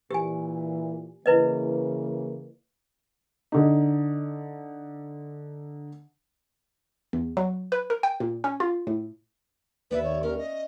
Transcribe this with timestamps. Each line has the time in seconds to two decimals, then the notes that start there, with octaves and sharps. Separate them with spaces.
0.11 A#2 E3 G4 G#5
1.26 C#3 E3 A#3 E4 B4 D#5
3.52 D3 D#4
7.13 E2
7.37 F#3
7.72 B4
7.90 A#4
8.03 G5
8.20 A#2
8.44 C#4
8.60 F4
8.87 A2
9.91 D#2 B3 B4 D5 E5
10.04 C#5
10.23 C#4 A#4
10.38 D#5